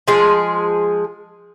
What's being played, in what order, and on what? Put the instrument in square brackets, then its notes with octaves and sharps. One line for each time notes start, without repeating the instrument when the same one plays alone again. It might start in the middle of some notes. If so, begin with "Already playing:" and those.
[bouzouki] F3 G#3 G#4